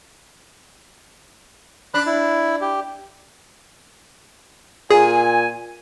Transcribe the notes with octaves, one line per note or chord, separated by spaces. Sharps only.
D4 B5 F#6
E4
G4
A#2 G#4 G#5